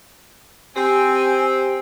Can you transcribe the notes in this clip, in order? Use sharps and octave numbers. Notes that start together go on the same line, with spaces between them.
C4 G4 G#5